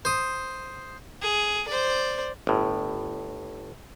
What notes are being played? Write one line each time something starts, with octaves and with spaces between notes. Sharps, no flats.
C5 D#6
G#4
C5 D5
G1 A2